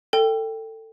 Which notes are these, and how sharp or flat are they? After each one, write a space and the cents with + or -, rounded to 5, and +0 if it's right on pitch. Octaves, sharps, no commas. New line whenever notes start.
A4 +20 G5 +0